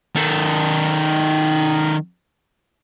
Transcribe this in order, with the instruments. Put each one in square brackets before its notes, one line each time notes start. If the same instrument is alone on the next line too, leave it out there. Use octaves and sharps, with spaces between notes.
[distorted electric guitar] D#3 A4